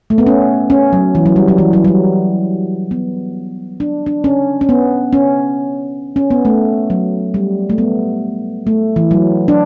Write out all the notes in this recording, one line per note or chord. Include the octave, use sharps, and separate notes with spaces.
A3
B3
C#4
C#4
F#3
E3
F#3
G3
F#3
E3
F#3
F#3
G3
B3
D4
D4
C#4
C#4
B3
C#4
C#4
B3
A3
F#3
G3
A3
B3
A3
E3
F#3
D4